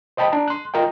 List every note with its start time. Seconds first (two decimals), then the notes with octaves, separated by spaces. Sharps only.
0.17 C5 D#5 G5 A5 B5
0.32 D4 A5 A#5
0.48 C6 F#6
0.74 F4 A#4 D#5 G5